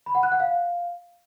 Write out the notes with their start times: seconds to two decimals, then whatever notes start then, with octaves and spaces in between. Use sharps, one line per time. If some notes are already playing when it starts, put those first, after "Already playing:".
0.06 B5
0.15 F#5
0.23 F#6
0.32 F#5
0.40 F5